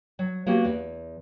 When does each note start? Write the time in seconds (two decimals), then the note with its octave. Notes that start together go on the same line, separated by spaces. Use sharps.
0.19 F#3
0.46 F#3 A#3 B3 C#4 F#4 G4
0.64 E2